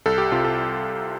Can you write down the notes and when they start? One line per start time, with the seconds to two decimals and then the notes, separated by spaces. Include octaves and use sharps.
0.06 C2 A4
0.18 G4
0.32 C3 F4
0.45 A4